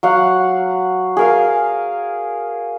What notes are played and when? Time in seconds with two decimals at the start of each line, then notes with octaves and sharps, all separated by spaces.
0.03 F#3 F5 F#5
1.17 G#4 A#4 F5